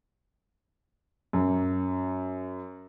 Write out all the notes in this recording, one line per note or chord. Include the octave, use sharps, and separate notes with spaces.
F#2